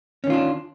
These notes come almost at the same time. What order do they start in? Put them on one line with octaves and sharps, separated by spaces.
C#4 D#3 F4 D4